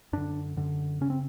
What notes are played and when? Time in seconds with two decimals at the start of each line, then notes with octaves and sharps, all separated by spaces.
0.13 F#2 D3 D4
0.57 F#2 D3
1.01 C#3 C#4
1.10 C4